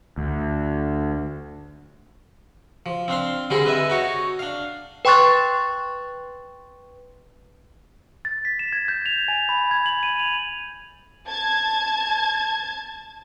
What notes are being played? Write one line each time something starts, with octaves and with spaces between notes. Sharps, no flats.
D2
F3
C4 D4 F5 C6
D3 G3 C4 G4 G#4 A#4
B4 D#5 E5 G#5
D#4 F#4 C#5
D4 F5
B4 G5 C6 C#6 F#6 A6
A6
B6
E7
G#6
G6
F7
G#5
B5
G#6
F#7
D#7
F7
A5 G#6